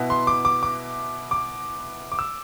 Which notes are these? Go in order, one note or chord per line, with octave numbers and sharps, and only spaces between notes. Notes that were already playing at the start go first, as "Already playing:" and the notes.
Already playing: B2 B3 E4
C6
D6
D6
D6
D6
D6
E6